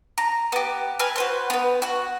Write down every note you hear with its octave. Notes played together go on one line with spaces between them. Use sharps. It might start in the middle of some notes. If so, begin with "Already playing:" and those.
A#5
B3 G4
B4 G#5 F6
F#4 B4 C5
B3 B4
F#4 F#5